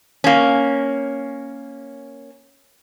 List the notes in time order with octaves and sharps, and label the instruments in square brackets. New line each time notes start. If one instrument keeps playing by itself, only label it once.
[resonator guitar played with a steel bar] A#3 C#4